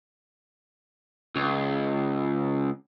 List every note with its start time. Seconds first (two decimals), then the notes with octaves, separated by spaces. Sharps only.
1.36 C#2